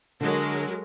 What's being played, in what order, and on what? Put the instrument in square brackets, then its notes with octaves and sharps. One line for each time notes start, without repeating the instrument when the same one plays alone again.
[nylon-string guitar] D3 [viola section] F#3 G#3 A#4